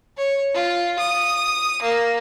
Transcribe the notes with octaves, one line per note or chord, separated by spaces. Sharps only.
C#5
F4
D#6
A#3